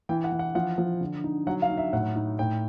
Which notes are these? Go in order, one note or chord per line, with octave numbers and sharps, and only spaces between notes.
E3 G5
F#5
E3
F#5
F3 F#5
F3
D3
D#4
F#3 F#5
F5
D#4
E5
A2 F#5
D#4
A2 G5